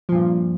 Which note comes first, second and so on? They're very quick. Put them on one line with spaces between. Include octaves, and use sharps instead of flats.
F3 A#2 G2